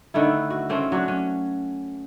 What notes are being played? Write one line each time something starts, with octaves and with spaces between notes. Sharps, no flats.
D3 D#3 A3 E4
F#4
C#3 A3 C4 C#4
F#3 D4 F#4
C#4